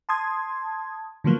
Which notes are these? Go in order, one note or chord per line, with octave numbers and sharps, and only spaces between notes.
A5 C6 D#6 G#6
D3 F3 F#3 A#3 B3